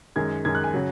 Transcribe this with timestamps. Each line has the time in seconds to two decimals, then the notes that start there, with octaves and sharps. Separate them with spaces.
0.16 F#2 D#3 G#3 G#6
0.45 F#2 D#3 G#3 G#6
0.55 F#6
0.64 G#5
0.74 C#3 F#3